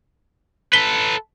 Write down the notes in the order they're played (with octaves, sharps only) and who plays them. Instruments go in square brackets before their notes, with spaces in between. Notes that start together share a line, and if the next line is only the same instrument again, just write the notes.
[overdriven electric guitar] A4 B4 [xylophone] B6 G7